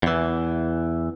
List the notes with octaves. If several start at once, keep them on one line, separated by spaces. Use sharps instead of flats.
E2 E3